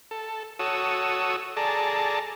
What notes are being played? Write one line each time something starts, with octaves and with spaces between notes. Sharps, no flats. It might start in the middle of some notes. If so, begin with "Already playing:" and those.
A4
F#4 A4 C#5 D#6 E6
G#4 A4 D5 A5 A#5